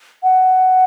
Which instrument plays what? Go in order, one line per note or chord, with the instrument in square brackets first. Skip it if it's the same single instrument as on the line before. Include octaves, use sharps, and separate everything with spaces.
[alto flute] F#5